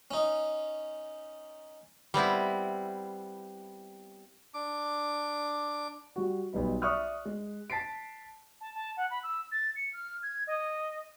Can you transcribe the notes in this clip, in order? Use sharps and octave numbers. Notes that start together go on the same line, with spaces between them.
C#4 D#4
G3 B3 C4 E4
D4 D6
G3 F#4
B1 G3 D#4 B4
D5 E5 C#6 D#6 F6 F#6
G#3
A5 A6 B6 C7 D7
A5
A5
F#5
B5
E6
A6
C#7
F6
G#6
D#5